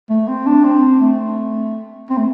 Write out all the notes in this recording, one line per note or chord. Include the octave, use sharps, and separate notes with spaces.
A3
C4
D4
C4
A3
C4
A3